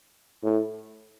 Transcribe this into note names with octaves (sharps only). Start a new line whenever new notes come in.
A2